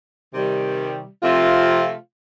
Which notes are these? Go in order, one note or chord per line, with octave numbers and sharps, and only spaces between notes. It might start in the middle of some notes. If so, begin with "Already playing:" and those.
C3 D#3 G3
C3 F3 A3 C4 F4